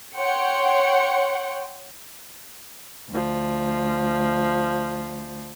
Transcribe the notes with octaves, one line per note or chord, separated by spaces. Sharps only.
C#5 F#5 G5 C6 C#7
D2 F3